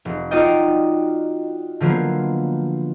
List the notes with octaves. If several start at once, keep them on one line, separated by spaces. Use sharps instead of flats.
F1
D#4 F4 F#4 D5 D#5 G5
D3 F3 F#3 A#3 B3